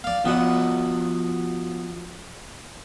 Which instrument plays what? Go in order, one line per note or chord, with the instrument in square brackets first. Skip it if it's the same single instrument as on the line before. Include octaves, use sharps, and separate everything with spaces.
[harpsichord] D5 F5
[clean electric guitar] F3 F#4 D#5 [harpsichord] B3 F#5